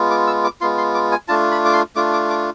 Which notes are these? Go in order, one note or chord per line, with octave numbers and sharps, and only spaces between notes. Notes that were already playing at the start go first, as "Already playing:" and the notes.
Already playing: G#3 B3 F4
D6
E6
D6
G#3 B3 F4 C6
C6
D6
G#5
A3 D4 F4 A5
B5
D6
C6
A3 D4 F4 D6
D6
D6